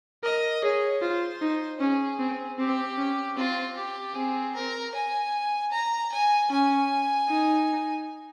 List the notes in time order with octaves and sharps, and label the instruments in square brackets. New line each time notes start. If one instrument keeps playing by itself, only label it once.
[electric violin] A#4 [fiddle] D#5
[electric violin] G#4 [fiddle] C#5
[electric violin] F4 [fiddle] C5
[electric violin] D#4
[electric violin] C#4 [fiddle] G#4
[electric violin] C4
[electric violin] C4 [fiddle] G4
[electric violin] C#4
[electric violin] C4 [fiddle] F4
[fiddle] G4
[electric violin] C4 [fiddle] G#4
[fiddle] A#4
G#5
A#5
G#5
[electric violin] C#4 [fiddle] G#5
[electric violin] D#4